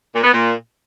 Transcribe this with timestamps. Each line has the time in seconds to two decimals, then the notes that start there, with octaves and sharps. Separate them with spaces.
0.14 A#2
0.23 B3
0.32 A#2